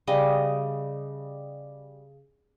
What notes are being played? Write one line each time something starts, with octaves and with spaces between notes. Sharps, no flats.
C#3 G3 D#5